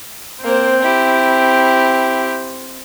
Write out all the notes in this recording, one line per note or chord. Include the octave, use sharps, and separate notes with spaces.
A#3 C4 C5
E4 G4